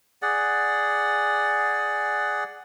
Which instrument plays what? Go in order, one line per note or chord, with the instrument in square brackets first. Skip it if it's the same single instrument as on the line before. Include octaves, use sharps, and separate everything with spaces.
[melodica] G#4 D5 F#5